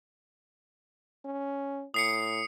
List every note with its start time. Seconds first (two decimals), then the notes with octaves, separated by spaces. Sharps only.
1.25 C#4
1.94 A2 D#6 C7 C#7